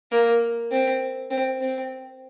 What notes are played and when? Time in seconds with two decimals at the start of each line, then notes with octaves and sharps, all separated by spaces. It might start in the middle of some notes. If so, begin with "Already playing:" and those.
0.12 A#3
0.71 C4
1.30 C4
1.61 C4